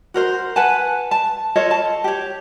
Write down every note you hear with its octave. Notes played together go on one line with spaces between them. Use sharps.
F#4 A#4 C5
B4 F#5 G#5 A5
A5
F4 A4 C#5 D#5
A5
G4 C#5